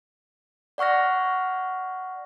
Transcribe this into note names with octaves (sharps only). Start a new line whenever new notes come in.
D5 F#5 C#6 F6 A#6